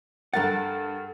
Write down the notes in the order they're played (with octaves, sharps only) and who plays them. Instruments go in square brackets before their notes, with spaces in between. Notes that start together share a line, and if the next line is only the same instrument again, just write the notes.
[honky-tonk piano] G2 A6 [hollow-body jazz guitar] A4 A#4 F#5